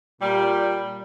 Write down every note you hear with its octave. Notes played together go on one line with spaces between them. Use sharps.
A#2 G3